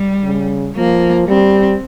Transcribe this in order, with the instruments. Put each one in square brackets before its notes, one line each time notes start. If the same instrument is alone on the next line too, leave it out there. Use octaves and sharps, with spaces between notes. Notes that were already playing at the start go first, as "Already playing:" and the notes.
Already playing: [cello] G3
[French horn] C#3
[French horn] F3 [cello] A#3
[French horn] G3 [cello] C4